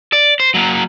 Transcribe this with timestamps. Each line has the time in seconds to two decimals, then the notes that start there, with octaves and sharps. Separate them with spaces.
0.13 D5
0.40 C5
0.54 F#3 A#3